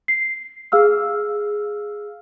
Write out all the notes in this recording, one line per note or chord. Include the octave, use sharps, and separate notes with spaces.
C7
G#4 F5 E6 F6